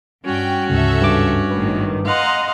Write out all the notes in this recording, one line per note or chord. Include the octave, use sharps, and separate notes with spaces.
G2 C#4 F#4 G5
D2 G#2 C#3 A4 E5
G2 D6
G#1 A2 D#3 B4
D#5 F5 F#5 A#5 C6